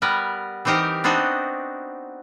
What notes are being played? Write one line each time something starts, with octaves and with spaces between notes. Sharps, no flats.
G3 B3 A#4 B4
E3 C4 D#4 G4 A#4 C5
B3 C4 D4 D#4 F#4